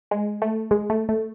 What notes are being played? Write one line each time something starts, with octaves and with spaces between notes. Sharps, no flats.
G#3
A3
G#3
A3
A3